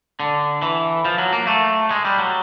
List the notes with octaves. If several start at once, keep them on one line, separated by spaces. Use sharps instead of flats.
D3
E3
F3
F#3
A#3
A3
G#3
G3
F#3